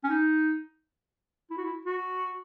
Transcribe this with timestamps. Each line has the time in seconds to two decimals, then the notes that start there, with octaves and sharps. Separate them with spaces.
0.04 C#4
0.09 D#4
1.50 E4
1.57 F#4
1.64 E4
1.85 F#4